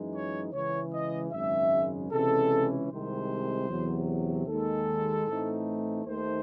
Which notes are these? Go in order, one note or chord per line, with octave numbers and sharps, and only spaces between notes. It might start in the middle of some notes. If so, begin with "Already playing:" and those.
Already playing: F#2 E3 G#3 D#4
C#5
C#2 C#3 E3 C#5
D#5
G#1 F#2 C#3 G#3 E5
C#2 C3 E3 G#3 C#4 A4
C2 C3 D#3 G#3 C5
E2 C3 F#3
D#2 D#3 G#3 A4
A2 E3 A3 C4 D#4
D#2 D#3 A3 C5